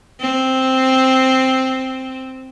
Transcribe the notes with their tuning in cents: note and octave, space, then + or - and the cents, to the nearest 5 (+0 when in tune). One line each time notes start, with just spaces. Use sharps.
C4 +0